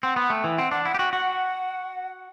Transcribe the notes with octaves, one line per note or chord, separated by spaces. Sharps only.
C4 F#5
B3
A3 G5
E3
C4 F#5
D4 F#5
E4 F#5
G4
F#4 G5
F#4 F#5